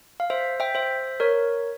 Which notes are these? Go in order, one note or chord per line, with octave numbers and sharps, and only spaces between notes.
F5
C5 E5
E5 G5
C5 E5
A#4 C#5